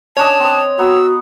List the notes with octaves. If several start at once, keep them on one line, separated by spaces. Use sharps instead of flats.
C#4 D4 C#5 D#5 A5
C4 D#6
B3 F#4 A#5 C#6 E6